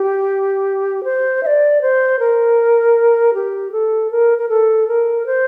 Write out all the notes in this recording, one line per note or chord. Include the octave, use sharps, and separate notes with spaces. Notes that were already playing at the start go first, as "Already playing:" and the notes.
Already playing: G4
C5
E5
D5
C5
A#4
G4
A4
A#4
A#4
A4
A#4
C5